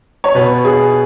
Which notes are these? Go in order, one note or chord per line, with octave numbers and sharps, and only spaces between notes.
C#5
B2 B3 B4
G#4